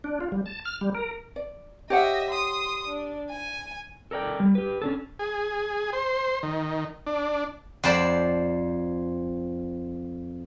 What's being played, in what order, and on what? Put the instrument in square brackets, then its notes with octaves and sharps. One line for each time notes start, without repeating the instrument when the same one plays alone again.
[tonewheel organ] D4
F4
G3
A5
F6
G3
A#4
[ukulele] D5
[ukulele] G4 C#5 F#5 [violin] D#5 E5
[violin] C6 D#6
D4
G#5
[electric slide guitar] A4 A#4 D5 G5
G3
G4 B4
C#4 D4 A4
[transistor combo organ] G#4
C5
D#3
D4
[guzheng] F2 C5 D5 A5 B5